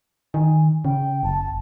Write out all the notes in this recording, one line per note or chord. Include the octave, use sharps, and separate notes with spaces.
D#3 G#5
C#3 G5
F#1 A5